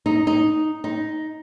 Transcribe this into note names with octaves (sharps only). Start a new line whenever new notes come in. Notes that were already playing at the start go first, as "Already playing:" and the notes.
D#4
D#4
D#4